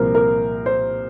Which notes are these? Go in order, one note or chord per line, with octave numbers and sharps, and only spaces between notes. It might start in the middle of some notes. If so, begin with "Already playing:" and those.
Already playing: C2 A#2 F3 A#4 C5
A#4
C5